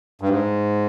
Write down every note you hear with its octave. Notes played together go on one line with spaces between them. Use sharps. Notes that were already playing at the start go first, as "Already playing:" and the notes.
G2
G#2